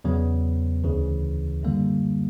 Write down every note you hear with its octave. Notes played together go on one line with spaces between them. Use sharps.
E2 C#3 F#3 B3
D2 C#3 E3
F#2 D3 G3 A#3